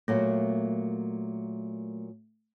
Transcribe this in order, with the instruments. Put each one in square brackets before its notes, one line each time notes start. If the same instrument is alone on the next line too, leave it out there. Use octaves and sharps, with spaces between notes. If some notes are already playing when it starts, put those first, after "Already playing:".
[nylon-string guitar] A#2 F#3 A#3 [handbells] A3